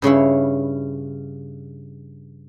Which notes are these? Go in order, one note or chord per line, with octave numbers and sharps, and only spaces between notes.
G2 C#3 C#4 E4